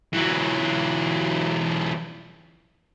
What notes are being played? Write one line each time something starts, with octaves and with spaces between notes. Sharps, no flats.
E3 F#3